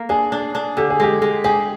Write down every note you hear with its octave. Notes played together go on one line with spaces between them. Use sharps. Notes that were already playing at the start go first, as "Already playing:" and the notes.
Already playing: A#3
D4 G#4
D4
D4
D3 G4
G#4
G#3 G4
G#3
G4 G#4